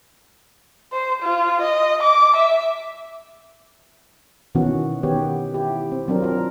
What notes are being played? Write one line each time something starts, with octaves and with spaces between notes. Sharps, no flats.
C5
F4
D#5
D6
E5
B2 D#3 E3 B3 C#4 F#4
D#3 B3 G4 C#5
E4 G4
C4
F#3 C4 D4 A#4
F4 A#4